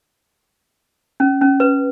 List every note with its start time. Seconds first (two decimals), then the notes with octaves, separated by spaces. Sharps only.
1.20 C#4
1.41 C#4
1.60 B4